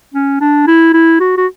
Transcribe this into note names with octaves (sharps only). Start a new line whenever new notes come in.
C#4
D4
E4
E4
F#4
F#4